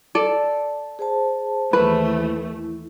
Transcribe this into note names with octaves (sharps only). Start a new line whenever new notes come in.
A4 D5
G#4 C5 A5
D#2 E3 A3 B4
E4